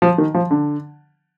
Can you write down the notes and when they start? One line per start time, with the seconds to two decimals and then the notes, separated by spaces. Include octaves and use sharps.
0.02 F3
0.18 D#3
0.34 F3
0.51 D3